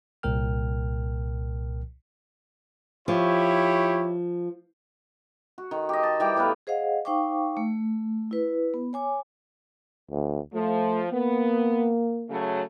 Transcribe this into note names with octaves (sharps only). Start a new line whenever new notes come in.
C2 A#2 A#4 G5 F6
F3 E4 G4 C#5
F#4
D#3
G4 D#5
A5
E3 G3 G5 D6
A2 B3 B4 F5
G#4 C5 D#5 F5 F#5
D#4 C5 F5 G5 C#6 D6
A3
E4 B4
B3
C#5 G#5 D6
D2
F3 A3
A#3 B3
C#3 F#3 A3